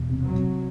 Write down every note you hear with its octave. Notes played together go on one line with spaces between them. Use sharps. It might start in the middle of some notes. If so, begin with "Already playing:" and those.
Already playing: E1
C3
F#3
C3